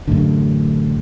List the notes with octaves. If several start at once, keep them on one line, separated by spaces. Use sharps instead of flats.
A1 F#2 A2 D3